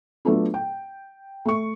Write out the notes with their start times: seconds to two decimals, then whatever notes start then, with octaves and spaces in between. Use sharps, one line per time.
0.25 F#3 A3 B3 D4 F4
0.54 G5
1.45 A3 C#6